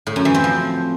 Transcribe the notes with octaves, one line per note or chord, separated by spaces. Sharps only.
A2
F#2
E3
C4
F3